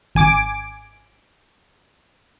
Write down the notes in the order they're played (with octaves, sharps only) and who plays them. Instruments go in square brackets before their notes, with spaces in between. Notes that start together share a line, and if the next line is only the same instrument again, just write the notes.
[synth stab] G#1 G#5 D6 D7